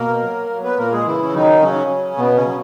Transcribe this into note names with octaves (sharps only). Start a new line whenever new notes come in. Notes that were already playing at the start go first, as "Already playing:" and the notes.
Already playing: B2 A#3 A#4
F#3
F#3
B3 B4
A#2 A#3 A#4
G#3 G#4
C#3 E3 E4
C#4
D#3 F#3 D#4
C#3 F#3 C#4
C#3
B2 B3
C#3 C#4
F#3